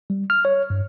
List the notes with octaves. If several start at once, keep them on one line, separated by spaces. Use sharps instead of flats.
G3
F6
C#5
G2